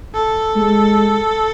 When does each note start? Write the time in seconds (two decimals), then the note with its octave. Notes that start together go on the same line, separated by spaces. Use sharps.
0.14 A4
0.56 G#3